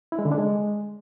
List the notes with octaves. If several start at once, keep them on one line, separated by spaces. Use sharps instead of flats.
E4
G#3
D3
D4
G#3